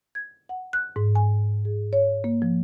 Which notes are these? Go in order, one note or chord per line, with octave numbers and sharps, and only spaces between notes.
G#6
F#5
F#6
G#2
G#5
G#4
C#5
A#3
F3